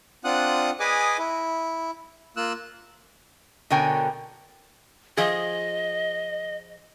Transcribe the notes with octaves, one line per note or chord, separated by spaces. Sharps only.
C4 D4 F4 F#5 D#6 F#6
G#4 B4 D#5 G#5 D6 D#6
E4
A#3 F4 E6 F#6
B2 D3 A#4 C#5 G5 G#5
F3 G#4 D#5